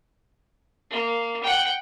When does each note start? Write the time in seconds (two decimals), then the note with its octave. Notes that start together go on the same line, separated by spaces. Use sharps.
0.91 A#3
1.43 F#5 G5